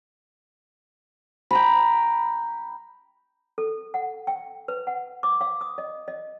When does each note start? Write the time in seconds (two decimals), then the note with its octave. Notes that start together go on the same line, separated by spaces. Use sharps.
1.51 G5 A#5 B5
3.58 A4
3.94 F#5
4.27 G5
4.68 B4
4.87 F#5
5.23 D6
5.41 F5
5.61 D#6
5.78 D#5
6.08 D#5